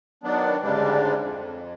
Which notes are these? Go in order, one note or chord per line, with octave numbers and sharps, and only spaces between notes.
D#3 F#3 B3 D4
D2 G#2 C#3 G3 G#3 D4
F2